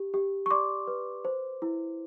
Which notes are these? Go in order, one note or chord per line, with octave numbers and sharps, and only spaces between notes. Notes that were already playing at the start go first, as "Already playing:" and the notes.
Already playing: G4
G4
C#6
D5 C6 D6
B4
C5
E4